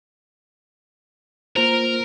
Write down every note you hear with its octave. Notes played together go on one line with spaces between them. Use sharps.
A#3 F4 A#4 C5